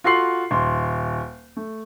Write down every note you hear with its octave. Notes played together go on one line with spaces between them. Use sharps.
F4 F#4 A4 C6 C7 F#7
D#1 C6
A3